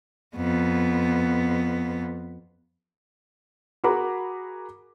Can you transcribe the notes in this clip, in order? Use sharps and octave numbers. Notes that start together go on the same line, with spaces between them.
F2 B3
F#4 G#4 A#4 A#5 B5 D6